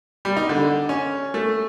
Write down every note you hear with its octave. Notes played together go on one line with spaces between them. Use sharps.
G3
D#4
D3
C#4
A3